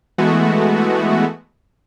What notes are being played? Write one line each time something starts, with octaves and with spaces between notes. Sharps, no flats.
E3 G#3 A3 B3 F#4